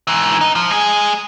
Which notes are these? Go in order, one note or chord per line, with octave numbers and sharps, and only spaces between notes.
G#2 E3
D#4
F3
G#3 G#4